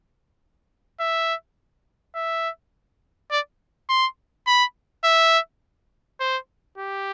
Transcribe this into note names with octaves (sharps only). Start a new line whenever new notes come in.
E5
E5
D5
C6
B5
E5
C5
G4